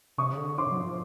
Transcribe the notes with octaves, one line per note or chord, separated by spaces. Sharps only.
C3 C#6 D#6
C#3
D3
C6 D6
F#3
F3